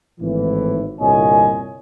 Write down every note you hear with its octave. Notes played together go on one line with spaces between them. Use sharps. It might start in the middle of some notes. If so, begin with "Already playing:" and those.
G#1 A2 E3
G1 C2 A#2 C#5 D#5 G#5